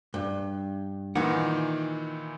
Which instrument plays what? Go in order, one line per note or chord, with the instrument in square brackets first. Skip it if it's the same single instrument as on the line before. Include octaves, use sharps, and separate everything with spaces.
[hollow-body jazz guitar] G2
[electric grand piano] A#2 D#3 E3 [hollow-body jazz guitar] D#4 F#5